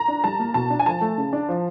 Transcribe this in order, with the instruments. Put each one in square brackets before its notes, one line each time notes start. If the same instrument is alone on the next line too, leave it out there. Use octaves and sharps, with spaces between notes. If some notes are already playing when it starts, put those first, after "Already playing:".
Already playing: [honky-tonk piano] A#5
[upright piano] D4
[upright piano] G3 [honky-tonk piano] A5
[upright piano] A#3
[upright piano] B2 [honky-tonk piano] A5
[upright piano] D4
[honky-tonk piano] G#5
[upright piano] F3 [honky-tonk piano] A5
[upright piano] A3
C#3
D4
F3